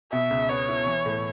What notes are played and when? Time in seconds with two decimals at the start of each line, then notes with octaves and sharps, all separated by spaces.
0.12 B2 E5
0.30 C#2
0.50 B3 C#5
0.69 E4
0.86 E3
1.06 A2